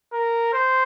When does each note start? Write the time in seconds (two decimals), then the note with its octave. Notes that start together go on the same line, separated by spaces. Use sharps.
0.13 A#4
0.53 C5